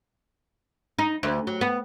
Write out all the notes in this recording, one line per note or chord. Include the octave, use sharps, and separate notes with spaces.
D#4
D2
F#3
B3